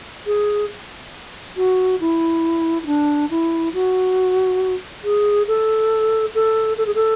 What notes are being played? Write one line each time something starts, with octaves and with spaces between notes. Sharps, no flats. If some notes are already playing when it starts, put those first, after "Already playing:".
G#4
F#4
E4
E4
D4
E4
F#4
G#4
A4
A4
A4
G#4
A4